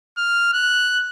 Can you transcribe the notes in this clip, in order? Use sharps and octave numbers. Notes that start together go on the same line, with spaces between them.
F6
F#6